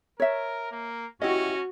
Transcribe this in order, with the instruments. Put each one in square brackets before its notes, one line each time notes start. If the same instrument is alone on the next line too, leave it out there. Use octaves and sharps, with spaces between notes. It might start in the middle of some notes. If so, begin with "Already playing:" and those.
[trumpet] A#4 [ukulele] C#5 E5
[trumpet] A#3
[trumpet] C#4 [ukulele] E4 G4 D#5 [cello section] F#4